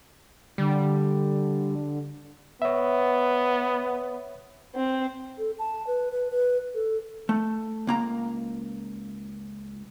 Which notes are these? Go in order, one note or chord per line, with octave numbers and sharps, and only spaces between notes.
D3 G3
B3 C#5 E5
C4
A4
A5
B4
B4
B4
A4
A3
C#2 A#3 A#5